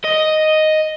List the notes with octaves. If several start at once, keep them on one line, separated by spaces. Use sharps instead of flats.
D#5